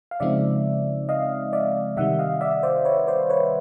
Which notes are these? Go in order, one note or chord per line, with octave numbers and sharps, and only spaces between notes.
F5
C#3 F3 G#3 C4 D#4 D5 E5
D#5 F5
D5 E5
C3 D#3 G3 E5 F#5
D#5 F5
D5 E5
C5 D5
B4 C#5
C5 D5
B4 C#5